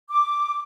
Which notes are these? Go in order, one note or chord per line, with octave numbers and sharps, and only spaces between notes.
D6